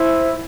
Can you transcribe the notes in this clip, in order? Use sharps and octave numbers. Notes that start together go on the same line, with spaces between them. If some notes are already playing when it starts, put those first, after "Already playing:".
Already playing: E4 C5